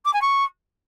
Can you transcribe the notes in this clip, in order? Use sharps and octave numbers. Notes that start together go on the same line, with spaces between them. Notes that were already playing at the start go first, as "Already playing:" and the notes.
D6
G#5
C#6